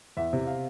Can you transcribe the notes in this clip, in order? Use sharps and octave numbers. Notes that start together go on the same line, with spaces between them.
E2 E5
C3
F5